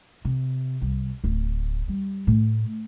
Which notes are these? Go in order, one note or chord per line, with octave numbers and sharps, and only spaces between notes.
C3
C2
D1
G3
A2